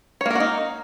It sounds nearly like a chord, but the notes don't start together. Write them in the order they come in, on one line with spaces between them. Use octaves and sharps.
C#5 A#3 A#4 F#4 D#4